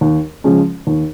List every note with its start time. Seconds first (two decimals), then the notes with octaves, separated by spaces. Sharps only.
0.01 D#2
0.44 C#3 F3 G#3 C#4
0.87 D#2